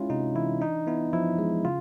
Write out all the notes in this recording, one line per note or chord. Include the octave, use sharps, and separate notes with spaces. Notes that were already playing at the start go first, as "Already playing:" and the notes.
Already playing: G#3 C#4 E4 F4
C3 D#4
E3 E4
D4 D#4
B3 E4
F3 E4
G#3
C#3 F4